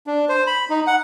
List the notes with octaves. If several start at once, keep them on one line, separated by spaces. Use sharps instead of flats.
D4
C5
B5
D#4
F#5